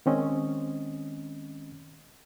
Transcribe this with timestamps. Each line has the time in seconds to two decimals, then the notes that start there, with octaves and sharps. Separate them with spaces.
0.06 D#3 G#3 C4 C#4 D#5